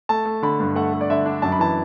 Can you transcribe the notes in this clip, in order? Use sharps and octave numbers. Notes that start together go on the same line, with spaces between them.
A3 A5
A3
D3 B5
G2
A3 F#5
A3
D5
D3 E5
D4
F#2 A5
B5
E3 A5